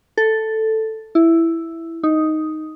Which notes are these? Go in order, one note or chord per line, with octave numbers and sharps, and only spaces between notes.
A4
E4
D#4